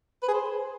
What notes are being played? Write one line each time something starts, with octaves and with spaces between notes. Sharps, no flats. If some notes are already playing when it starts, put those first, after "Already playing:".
B4
G#4
C5